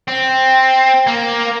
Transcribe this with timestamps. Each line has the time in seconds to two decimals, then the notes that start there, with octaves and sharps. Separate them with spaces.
0.08 C4
1.07 A#3